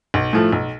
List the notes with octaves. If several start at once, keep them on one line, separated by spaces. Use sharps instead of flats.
B1
A2 F3 A3
B1